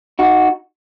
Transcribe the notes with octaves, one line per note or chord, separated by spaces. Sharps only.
D#4 F#4